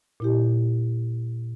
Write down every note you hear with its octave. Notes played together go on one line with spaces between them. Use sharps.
A#2 E4 G4